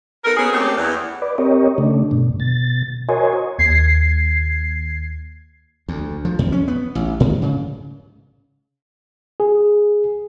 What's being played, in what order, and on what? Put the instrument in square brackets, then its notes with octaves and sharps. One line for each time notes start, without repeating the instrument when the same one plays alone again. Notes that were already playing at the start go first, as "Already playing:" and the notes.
[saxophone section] B3 D#4 A4 A#4
A#3 B3 C#4 F#4 G#4
A3 A#3 C4 C#4 D#4 G4
E2
[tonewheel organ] B4 D5
C4 G4 A#4 C#5 D#5
C#3 A3 D4
G2 B2
B2 A6
F#4 A#4 C5 C#5 D#5 G#5
[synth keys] D#2 G#6 C7
[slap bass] D2
F3
F2
C#4
B3
A1
G#2
C#3
[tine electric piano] G#4